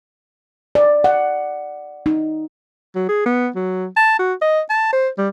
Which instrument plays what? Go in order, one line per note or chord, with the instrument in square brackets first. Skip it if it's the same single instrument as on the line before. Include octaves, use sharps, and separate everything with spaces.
[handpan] D5
F#5
D#4
[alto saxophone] F#3
G#4
B3
F#3
A5
F#4
D#5
A5
C5
G3